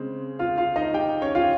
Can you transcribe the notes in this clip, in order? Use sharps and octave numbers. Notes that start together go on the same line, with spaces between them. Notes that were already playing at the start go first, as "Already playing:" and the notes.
Already playing: C#3 G#3 C4
F4 F5
F4 F5
D#4 D#5
G4 G5
C#4 C#5
F4 F5